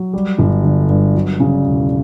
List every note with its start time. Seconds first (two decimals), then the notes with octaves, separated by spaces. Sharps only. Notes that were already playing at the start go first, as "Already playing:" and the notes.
Already playing: F#3
0.13 G3
0.39 G1
0.64 D3
0.89 G2
1.15 F#3
1.40 C#3
1.66 E1